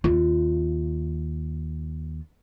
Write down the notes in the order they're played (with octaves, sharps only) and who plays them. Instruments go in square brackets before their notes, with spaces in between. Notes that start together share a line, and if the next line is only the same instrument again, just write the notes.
[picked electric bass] D#2 [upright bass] F4